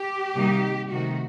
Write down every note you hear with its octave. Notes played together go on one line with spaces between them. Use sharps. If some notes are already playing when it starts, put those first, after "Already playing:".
Already playing: G4
C3 D#3 G3 A#3 D#4
C3 D#3 A3 D#4 F#4